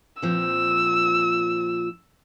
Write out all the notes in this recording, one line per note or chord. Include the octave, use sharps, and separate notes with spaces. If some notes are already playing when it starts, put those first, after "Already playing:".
A#2 F3 C4 E6